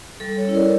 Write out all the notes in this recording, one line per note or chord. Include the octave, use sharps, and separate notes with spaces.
G3 A4
A4 C#5
C#4 E4
A#4 D5